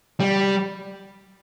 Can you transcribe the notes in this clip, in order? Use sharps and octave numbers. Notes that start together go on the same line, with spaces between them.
G3